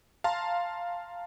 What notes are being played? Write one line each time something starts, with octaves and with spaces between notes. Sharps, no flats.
F5 A5 A#5 C6